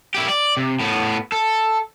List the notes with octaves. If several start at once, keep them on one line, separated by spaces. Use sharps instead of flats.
E4 G4
D5
C3
A2 B3
A4